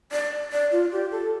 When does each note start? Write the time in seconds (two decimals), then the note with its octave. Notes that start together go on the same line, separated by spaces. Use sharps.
0.12 D5
0.52 D5
0.72 F4
0.92 G4
1.11 A4